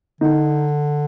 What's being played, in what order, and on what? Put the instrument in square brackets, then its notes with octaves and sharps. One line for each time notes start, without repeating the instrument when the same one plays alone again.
[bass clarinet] D3 [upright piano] D#4